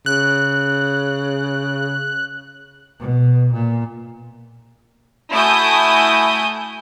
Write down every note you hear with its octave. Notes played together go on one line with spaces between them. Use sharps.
C#3 F#6
B2
A#2
A3 E4 F#4 G#5 D#6 G6